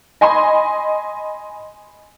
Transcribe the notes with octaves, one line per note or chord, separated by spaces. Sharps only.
D#5 G#5 B5 C6